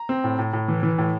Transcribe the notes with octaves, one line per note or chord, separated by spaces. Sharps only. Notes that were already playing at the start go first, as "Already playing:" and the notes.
Already playing: A#5
C4
A2
A2
A2
E3
E3
A2